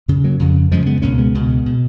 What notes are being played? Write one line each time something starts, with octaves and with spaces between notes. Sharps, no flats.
F#2 C#3
F#3 A#3
F2 C#3
F#2 C#3 F3 G#3
G#3 B3
C#2 B2 A#3 C#4
G#3 B3
C#2 B2
B2